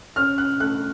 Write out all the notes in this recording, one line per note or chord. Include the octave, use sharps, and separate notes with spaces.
C#4 F6
F#6
A3 F#6